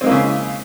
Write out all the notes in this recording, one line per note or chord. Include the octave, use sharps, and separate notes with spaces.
C#3 G#3 A#3 C4 E4